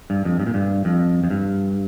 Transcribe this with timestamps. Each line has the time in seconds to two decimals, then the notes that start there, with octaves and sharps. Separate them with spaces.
0.10 G2
0.25 F2
0.40 G2
0.46 A#2
0.54 G2
0.85 F2
1.24 F2
1.30 G2